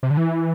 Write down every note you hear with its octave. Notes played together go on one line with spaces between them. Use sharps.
C3
D3
E3